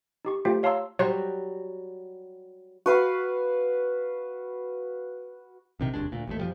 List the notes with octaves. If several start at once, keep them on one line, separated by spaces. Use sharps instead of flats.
D#4 G4 C#6
A3 F4 G4 C5 G5
C#5 F5 A5 A#5 C6 E6
F#3 G3 F#4 C5
F#4 B4 F5
A#1 C3 D#3
F1 D#2 G#3 D4
D2 A#2
A1 D#2 A3
F#2 F3 G3